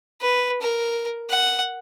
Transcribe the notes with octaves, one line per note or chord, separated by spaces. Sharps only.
B4
A#4
F#5